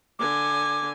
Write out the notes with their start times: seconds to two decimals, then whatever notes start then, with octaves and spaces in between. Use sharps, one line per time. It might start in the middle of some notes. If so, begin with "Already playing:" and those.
0.19 D3 G#5 D6